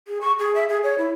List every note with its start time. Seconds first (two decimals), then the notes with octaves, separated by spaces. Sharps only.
0.07 G#4
0.21 C#6
0.39 G#4
0.55 E5
0.69 G#4
0.83 C#5
0.98 E4